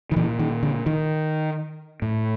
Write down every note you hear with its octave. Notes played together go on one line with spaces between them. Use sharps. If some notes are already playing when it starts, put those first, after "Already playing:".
D#3
A#2 E3
D#3
D3
D#3
A2